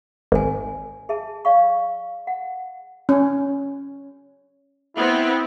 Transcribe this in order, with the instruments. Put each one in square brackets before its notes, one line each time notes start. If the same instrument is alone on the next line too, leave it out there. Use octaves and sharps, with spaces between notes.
[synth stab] G#1 [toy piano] C#5 G#5
[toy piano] G#4 E5 A5
D5 F5 C#6
F#5
[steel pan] C#4
[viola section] B3 C4 [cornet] E4